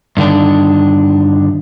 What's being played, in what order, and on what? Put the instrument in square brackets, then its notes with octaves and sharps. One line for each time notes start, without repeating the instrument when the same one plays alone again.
[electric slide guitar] G2 D3 D#3 D4